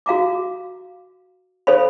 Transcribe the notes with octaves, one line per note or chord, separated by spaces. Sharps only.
F#4 F5 A#5 D6
A4 C5 C#5 F5 B5